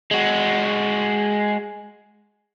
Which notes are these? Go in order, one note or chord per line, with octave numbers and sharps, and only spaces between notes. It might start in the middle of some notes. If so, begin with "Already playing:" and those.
G#3 F#4